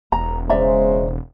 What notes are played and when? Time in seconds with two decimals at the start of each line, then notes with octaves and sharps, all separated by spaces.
0.12 E1 A#5
0.49 C#3 G#3 C5 D5 E5 A#5